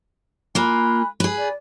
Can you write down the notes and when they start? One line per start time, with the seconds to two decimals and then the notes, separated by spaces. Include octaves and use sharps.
0.55 A#3 F4 G#5 B5 F#6
1.20 G#4 B4
1.37 D5